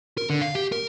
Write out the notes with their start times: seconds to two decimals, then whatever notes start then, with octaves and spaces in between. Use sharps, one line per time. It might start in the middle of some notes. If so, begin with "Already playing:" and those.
0.18 A#4
0.30 D3
0.41 F5
0.55 G4
0.72 A#4